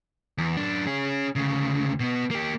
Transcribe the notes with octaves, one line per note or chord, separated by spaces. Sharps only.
E2
F#2 D4
C#4 G#4
D2 C#3
B2 B3
A#3 G4